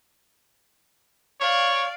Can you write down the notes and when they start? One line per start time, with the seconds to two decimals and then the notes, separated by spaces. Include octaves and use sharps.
1.41 C#5 D5 F5